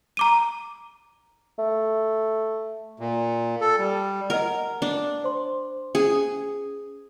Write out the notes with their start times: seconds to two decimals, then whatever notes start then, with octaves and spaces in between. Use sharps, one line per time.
0.17 A#5 D6 D#7
1.59 A3
3.00 A#2
3.61 A4
3.78 G3
4.30 A#4 D#5 F#5
4.82 D4
5.24 C5 C6
5.95 C#4 G#4